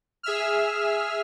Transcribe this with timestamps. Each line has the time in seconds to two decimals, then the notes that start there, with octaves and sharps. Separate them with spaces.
0.23 G#4 E5 E6 F6